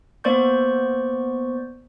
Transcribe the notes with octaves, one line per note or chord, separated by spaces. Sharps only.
A#3 B3 C5 D5 C#6 G6